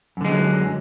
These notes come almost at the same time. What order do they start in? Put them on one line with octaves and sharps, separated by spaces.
F#2 D3 G#3 D#3 F#3